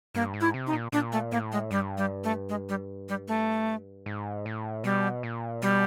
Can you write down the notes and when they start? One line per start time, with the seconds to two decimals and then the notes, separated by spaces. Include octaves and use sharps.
0.15 G2 A#3
0.34 G#2
0.41 E4
0.54 C3
0.67 D#4
0.73 A#2
0.92 A#2 D4
1.12 A3
1.32 A2 A#3
1.52 G#3
1.71 G2 G3
1.97 G3
2.24 A3
2.49 G#3
2.69 G3
3.09 G3
3.28 A3
4.06 G#2
4.46 A2
4.84 B2 G3
5.23 A#2
5.62 B2 G3